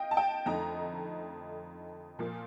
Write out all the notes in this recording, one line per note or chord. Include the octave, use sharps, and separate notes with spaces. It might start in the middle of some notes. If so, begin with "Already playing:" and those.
Already playing: D#5 F5 G5
A5
G5
F2 D3 A3 D#4 A#5
A#2 F3 A#3